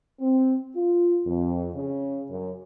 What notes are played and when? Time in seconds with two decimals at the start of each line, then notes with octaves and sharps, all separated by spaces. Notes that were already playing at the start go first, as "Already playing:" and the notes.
0.20 C4
0.75 F4
1.26 F2
1.74 C#3
2.30 F#2